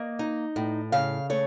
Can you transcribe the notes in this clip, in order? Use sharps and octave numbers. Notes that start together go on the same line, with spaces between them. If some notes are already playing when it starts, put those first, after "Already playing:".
Already playing: A#3 D#5
D#4
A2
C#3 F5
A3 C#5